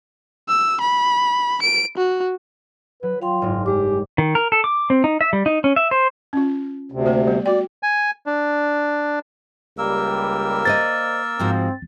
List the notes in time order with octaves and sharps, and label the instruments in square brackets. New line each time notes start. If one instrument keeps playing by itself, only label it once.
[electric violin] E6
B5
D7
F#4
[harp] F#3 [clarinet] B4
[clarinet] F4 [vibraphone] F5 G5 C6
[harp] F#1 G#2 A#4
[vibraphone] G3 G#3 D6 [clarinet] G4
[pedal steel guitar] D#3
A#4
A4
D6
C4
D#4
E5
G3
D#4
C#4
E5
C5
[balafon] C#4 F4
[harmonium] D2 C3
[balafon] A3 A#3 G4
G3 B3
[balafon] F#4 G5 [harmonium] D5
[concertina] G#5
D4
[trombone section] C#2 G3 [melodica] A#3 A#4 E6
[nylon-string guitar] C5 D5 D#5 [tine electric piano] A6
[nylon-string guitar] G#2 F3 F#4 [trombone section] C4